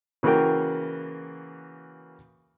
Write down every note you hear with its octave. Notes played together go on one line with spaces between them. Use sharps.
C#3 E3 A#3 F#4 A#4 G5